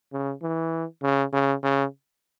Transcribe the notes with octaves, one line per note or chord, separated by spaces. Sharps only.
C#3
E3
C#3
C#3
C#3